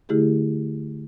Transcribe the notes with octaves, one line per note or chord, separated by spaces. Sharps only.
D3 A3 E4 G4 G#4